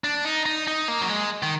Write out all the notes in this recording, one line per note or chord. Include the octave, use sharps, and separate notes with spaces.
D4
D#4
D#4
D#4
A#3
F#3
G#3
D#3